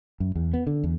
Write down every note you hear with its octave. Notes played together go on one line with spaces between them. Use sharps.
F#2
E2
B3
D3
E2